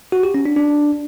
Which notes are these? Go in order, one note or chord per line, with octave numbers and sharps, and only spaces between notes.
F#4
G4
C#4
D4
D4